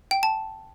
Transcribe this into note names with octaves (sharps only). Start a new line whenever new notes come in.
G5
A5